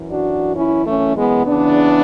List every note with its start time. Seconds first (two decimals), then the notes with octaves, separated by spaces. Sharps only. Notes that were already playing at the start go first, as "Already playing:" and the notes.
Already playing: F#2 E3
0.10 D4 F#4
0.56 C#4 E4
0.86 A3 C#4
1.17 G#3 B3
1.46 E2 C#3 E3 B3 D4